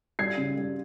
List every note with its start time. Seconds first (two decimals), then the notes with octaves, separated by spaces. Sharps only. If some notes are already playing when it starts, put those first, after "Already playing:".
0.19 G3 G#6 C7
0.37 C#3
0.57 G3